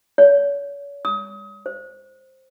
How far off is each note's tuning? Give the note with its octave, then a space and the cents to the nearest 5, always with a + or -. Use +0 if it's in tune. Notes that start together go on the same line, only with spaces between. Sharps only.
C#5 +40
D#6 +30
C5 +5